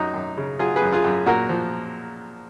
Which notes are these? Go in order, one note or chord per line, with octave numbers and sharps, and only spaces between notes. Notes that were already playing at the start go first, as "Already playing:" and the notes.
Already playing: F#2 D#4 F#4
F#2
C#3
F#3 F4 G#4
G#4 B4
F#2
F4 G#4
F#2
A#2 F#4 A#4
F3